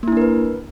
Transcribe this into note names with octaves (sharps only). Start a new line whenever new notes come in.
A#3 D4 E4 A#4 B4